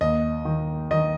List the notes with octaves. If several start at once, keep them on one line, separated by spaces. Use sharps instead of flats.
D#2 D#5
D#3
D#3 D#5